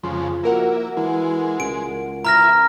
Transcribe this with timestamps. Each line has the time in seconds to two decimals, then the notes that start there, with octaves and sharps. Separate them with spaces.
0.04 F2 C#3 F3 G#3 C6
0.44 A#3 E4 F#4 A#4 F#5
0.97 E3 G#3
1.60 C#2 D7
2.25 E4 B4 E5 A#5 F6 A#6